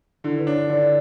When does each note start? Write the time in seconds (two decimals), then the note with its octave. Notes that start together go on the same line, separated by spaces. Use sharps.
0.24 D3 E4
0.39 B4
0.47 D4 C#5
0.69 D3 D5